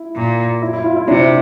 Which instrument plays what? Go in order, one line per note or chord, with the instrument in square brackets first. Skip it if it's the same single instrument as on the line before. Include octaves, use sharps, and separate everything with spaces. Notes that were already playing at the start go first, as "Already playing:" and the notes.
Already playing: [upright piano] E4
[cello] A#2
[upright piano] E4
E4
F4
E4
[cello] C3 [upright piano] D4